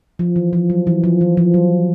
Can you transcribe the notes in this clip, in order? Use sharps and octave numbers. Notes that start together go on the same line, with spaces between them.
F3
E3
F3
F#3
E3
F3
E3
F3
F#3